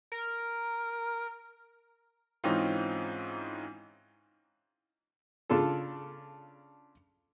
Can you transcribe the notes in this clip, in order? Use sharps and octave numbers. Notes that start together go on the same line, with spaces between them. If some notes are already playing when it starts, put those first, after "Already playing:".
A#4
G#2 E3 C4 C#4 D#4 F4
C#3 D4 F4 A4